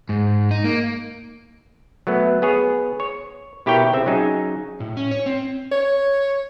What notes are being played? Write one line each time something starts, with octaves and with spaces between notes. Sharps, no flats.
G#2
D#4
A#3
F#3 A3 B3
B3 G#4 C#5
C#5
B2 E4 G4 A#4 C#5 G5
C#3 C4 E5
F#3 C#4 D#4 G#4
A2
C#4
C#5
C4
C#5